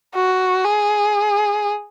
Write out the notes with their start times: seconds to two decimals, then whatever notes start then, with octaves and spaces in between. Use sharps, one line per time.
0.15 F#4
0.65 G#4